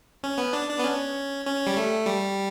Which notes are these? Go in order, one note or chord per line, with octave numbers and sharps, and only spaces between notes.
C#4
B3
D4
D4
B3
C#4
C#4
G3
A3
G3